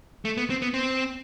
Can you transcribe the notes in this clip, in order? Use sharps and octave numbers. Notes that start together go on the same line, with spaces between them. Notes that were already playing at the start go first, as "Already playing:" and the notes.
A3
B3
C4
B3
C4